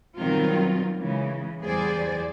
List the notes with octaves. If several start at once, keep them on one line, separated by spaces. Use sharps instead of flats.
B2 D#3 F#3 G3 C4 F4
C#3 E3 G#3
E2 G3 G#4 C5 D5